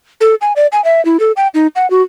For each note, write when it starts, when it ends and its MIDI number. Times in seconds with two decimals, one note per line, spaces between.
0.21 0.35 69
0.41 0.53 80
0.56 0.67 74
0.72 0.83 80
0.84 1.03 76
1.05 1.20 64
1.20 1.32 69
1.37 1.48 79
1.54 1.67 63
1.76 1.89 78
1.90 2.02 66